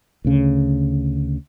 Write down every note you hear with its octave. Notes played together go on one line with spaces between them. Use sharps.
D2 C#3